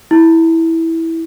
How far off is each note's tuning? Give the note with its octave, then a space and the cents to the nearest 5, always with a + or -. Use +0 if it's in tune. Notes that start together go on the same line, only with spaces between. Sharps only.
E4 -10